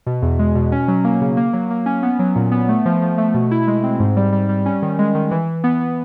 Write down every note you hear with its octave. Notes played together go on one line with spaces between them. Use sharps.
B2
E2
G#3
B2
C#4
F#3
A#3
C#3
A#3
F#3
A#3
C#4
B3
F#3
A#2
B3
A3
F3
F3
A3
B2
E4
G#3
C4
G#2
G3
G3
G3
C#4
D#3
G#3
D#3
E3
E3
B3
B3